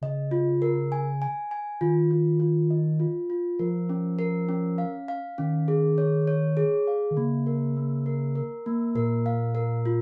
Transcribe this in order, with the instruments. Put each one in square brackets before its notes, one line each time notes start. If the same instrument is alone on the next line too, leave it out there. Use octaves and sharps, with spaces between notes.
[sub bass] C#3 [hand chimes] D#5
[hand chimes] F4
A#4
G#5
G#5
G#5
[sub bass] D#3 [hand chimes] F4
[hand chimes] F4
F4
D#5
F4
F4
[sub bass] F3 [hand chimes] A#4
[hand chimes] C#4
A#4
C#4
F5
F5
[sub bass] D#3 [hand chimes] C#4
[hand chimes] G#4
C#5
C#5
G#4
F5
[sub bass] D#3
[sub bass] C#3 [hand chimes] A#3
[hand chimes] A#4
A#3
A#4
A#4
A#3
[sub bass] A#2 [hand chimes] A#4
[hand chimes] F5
A#4
F4